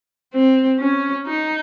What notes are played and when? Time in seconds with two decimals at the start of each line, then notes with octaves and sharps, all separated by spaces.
0.34 C4
0.79 C#4
1.27 D#4